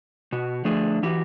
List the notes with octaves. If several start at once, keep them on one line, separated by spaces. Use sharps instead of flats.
B2 F#4
D3 F3 A3 D4 G#4 B4
E3 E4 F#4 G4